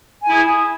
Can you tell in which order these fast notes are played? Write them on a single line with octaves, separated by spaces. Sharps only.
G#5 E4 G#4